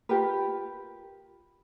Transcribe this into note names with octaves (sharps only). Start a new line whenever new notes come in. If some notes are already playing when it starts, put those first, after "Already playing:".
F4 G4 A#4 B4